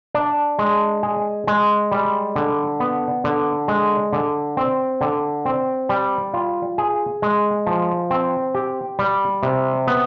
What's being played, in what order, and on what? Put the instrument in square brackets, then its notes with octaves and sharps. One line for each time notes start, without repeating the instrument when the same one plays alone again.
[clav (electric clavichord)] D4
G#3
G#4
G#3
G3
D3
B3
D3
G#3
D3
C4
D3
C4
G3
F4
G#4
G#3
F3
C4
G4
G3
C3
B3